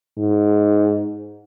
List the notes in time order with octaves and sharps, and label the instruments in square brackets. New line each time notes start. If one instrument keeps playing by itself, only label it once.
[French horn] G#2